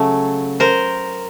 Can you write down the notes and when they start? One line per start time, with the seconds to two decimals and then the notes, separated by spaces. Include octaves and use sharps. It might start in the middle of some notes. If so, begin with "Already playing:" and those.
Already playing: C#3 F#3 A3
0.60 A#4 C5